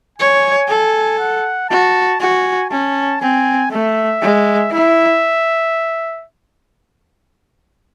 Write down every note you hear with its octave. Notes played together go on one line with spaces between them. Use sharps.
C#5 G#5
A4
F#5
F#4 A5
F#4 G#5
C#4 A5
C4 G#5
A3 E5
G#3
E4 E5